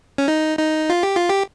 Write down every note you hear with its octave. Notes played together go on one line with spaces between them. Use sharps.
C#4
D#4
D#4
F4
G4
F4
G4